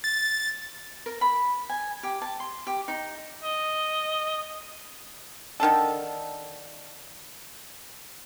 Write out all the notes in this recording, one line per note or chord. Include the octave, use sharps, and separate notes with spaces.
A6
A#4
B5
G#5
G4
A5
C6
G4
D#4
D#5
D3 D#3 D4 A4